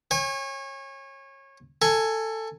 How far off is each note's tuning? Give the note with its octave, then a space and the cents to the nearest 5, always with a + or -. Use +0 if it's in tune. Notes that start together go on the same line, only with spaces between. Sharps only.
C#5 -25 G#5 -40
A4 +15 G#5 +0